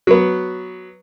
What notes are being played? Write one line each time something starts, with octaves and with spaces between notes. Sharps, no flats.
F#3 B3